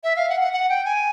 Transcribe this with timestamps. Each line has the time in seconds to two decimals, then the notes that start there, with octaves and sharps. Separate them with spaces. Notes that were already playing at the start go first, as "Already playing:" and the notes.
0.04 E5
0.16 F5
0.29 F#5
0.41 F#5
0.53 F#5
0.69 G5
0.85 G#5